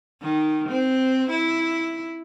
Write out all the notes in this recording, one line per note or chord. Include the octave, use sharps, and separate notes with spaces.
D#3
C4
E4